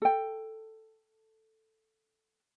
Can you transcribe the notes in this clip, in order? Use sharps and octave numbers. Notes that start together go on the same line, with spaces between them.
A4 G5